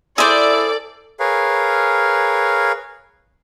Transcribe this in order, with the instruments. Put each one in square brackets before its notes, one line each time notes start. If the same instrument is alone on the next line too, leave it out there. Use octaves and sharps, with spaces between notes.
[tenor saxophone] E4 [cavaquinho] G#4 C5 [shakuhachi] A4 [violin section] D5
[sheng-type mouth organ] G#4 A#4 B4 C#5 F5